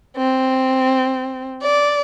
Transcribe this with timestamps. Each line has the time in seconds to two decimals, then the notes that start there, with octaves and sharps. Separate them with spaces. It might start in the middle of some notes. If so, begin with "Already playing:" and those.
0.17 C4
1.62 D5